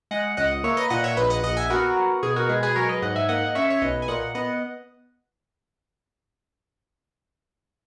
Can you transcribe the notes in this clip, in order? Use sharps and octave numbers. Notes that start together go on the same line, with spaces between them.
G#3 D#5 F#5
C#2 D#5 F#5
A#3 C#5 E5
B4 D#5
A#2 D#5 F#5
C#5 E5
A#1 B4 D#5
D#5 F#5
A#1 D#5 F#5
E5 G#5
B3 F#4 A#4
B3
B2 G#4
F#4 A#4
G#3 G#4 B4
G#4 B4
F#3 A#4 C#5
B4 D#5
G#2 D#5 F#5
E5 G#5
A#3 D#5 F#5
D#5
C#4 C#5 E5
C#5
B1 B4 D#5
G#5
A#2 D#5 F#5
B3 D#5 F#5